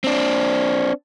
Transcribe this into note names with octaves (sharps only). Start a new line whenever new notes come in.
C4 D4